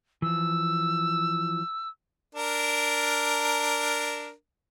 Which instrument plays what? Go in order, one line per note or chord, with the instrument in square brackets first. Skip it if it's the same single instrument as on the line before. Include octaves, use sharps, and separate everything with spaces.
[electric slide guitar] E3 F3 [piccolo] E6
[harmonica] D4 A#4